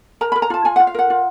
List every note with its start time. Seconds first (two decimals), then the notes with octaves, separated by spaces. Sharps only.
0.21 A#4 A#5
0.32 A#4 B5
0.42 A#5
0.50 F4 A5
0.65 F4 G#5
0.76 F4 F#5
0.87 F5
0.94 A#4 F#5
1.10 F4